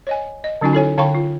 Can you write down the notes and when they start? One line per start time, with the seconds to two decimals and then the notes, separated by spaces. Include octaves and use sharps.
0.07 C#5 D#5 G#5
0.44 D#5
0.61 D3 F#3 C#4 D#4 F#4 G#5
0.73 E4 A4 C#5 G#5
0.97 D3 C#5 F5 G5 B5 C#6
1.15 F4